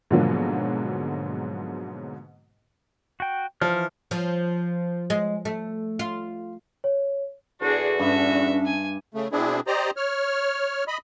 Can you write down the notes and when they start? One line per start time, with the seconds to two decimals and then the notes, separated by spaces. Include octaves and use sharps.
0.11 G#2 B2 D3 F3 F#3 A#3
3.20 F#4 G5
3.61 E3 F3 F6
4.11 F3
5.10 G#3
5.45 A3
5.99 F4
6.84 C#5
7.62 E2 D3 D4 F#4 G#4
7.99 G2 C#4 E5
8.66 G#5
9.14 C#3 A3
9.32 B2 C4 D4 E4 G#4
9.67 G4 C5 D5 D#5 A#5
9.97 C#5 F6
10.88 D#5 B5